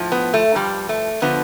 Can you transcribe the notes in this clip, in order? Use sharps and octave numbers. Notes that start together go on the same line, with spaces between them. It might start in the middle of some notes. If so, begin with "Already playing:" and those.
Already playing: A2 F3
B3
A3
G2 F3 G3
A3
D3 F3 B3